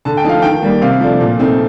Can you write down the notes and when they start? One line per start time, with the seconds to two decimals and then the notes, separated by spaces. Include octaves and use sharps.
0.05 D3 A5
0.17 G5
0.24 F3 A3 D#4 F5
0.42 D#3 G5
0.62 G3 A#3
0.81 C3 F5
1.01 F3 A3 D4
1.20 A#2
1.39 A3 C4 D#4